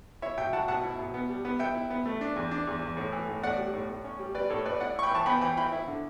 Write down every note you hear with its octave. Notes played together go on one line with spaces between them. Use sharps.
E4 C#5 E5
B2 E5 G5
F#3 F#5 A5
B2 F#5 A5
E4
B2
B3
G3
B3
B3 E5 G5
E4
B3
A3
D4
E2
D4
E2
E2
A2
E3
A2
A2 D5 F#5
G3
A2
A2
C#4
G3
G3 B4 D5
A2 A4 C#5
A2 B4 D5
E4 D5 F#5
E4 C#6
G5 B5
E3 A5 C#6
B3 G5 B5
E3 G5 B5
E4 G5 B5
E4
D3